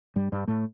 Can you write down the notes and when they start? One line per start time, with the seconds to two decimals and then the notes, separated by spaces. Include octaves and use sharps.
0.16 G2 G3
0.32 G2 G3
0.47 A2 A3